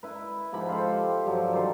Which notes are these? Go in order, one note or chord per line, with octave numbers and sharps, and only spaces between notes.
E4 B4
G#2 F3 G4 B5
F4 A4 C5
G4 G5
G2 F3 F#3
D#3 G4 A4 C5